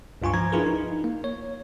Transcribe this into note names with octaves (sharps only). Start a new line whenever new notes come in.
C#2 G2 F4 G#5 C#6
F3 A#5 G#6
D4 E4 F4 G#4 A#4 B4
D#4
A#3
C#5